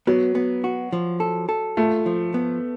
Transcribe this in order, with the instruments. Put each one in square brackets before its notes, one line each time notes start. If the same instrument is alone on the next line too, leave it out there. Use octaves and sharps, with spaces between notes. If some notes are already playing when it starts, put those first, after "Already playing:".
[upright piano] F#3 [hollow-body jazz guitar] B3
[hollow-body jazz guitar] B3
F#4
F3
A4
A4
[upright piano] A3 [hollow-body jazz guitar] F4
[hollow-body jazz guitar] F3
B3